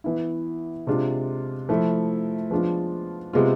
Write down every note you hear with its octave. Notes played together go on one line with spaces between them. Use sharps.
E3 B3 E4
C3 G#3 D4 F4
F3 A3 E4
F3 G#3 B3 D4 F4
C3 G#3 B3 F4